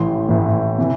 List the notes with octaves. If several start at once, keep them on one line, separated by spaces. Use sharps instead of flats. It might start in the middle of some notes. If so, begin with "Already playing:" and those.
Already playing: A1 A2 E3 C6
A1 A2 E3
C3 E3